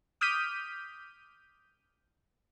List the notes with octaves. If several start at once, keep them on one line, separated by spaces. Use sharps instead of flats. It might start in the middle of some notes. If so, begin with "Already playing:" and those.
D6 D#6 F6 G6 B6 D#7